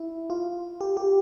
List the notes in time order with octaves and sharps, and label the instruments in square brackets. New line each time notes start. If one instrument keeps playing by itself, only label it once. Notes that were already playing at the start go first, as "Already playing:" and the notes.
Already playing: [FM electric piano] E4
F4
G4
G4